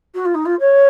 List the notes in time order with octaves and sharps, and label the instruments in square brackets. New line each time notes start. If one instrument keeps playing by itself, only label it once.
[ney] F#4
F4
D#4
F4
C#5